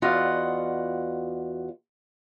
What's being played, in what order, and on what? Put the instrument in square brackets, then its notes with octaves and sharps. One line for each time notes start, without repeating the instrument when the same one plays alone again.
[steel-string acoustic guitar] E2 F4 F#4 G#4 D5 D#5